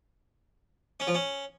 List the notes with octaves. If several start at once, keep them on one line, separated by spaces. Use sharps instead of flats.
C#4
F3
C#4